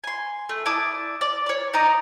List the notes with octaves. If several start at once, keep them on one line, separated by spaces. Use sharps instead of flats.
G#5 C6
A3
E4 D5 A5 D#6
D5
C#5 D5
D#4 D5 A#5 D#6